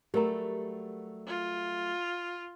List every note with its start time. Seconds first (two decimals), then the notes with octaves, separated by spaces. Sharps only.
0.14 F#3 G3 A3 G4 A#4 A#5
1.27 F4